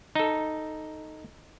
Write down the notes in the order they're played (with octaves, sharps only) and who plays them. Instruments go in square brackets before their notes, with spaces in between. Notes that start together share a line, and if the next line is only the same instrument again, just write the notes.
[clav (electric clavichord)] D#4 A4